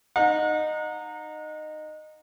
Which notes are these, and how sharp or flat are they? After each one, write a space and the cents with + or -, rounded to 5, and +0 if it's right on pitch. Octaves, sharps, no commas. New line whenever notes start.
D#4 -15 F#5 -35